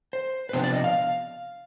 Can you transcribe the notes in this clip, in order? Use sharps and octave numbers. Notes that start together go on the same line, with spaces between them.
C5
B4
C3 F3 B3 D4 C5
D5
D#5
F5